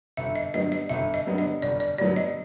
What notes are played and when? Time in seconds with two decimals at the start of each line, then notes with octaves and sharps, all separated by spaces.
0.17 G1 E5
0.36 D#5
0.54 G2 D3 F#3 B3 D#5
0.72 D#5
0.90 G1 E5
1.14 D#5
1.26 G2 D3 F#3 B3
1.38 D#5
1.62 G1 D5
1.80 D5
1.98 G2 D3 F#3 B3 D5
2.16 D#5